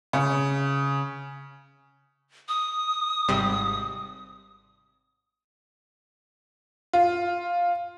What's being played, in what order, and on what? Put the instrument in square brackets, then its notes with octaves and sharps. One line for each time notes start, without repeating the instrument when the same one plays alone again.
[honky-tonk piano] C#3
[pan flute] D#6
[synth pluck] G#1 C3 G3
[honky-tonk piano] F4